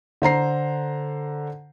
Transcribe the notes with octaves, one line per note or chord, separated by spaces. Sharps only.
D3 C5 A#5 C7